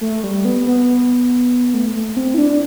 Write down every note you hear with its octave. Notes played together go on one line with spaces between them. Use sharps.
A3
G3
B3
B3
A3
A3
C4
E4
D4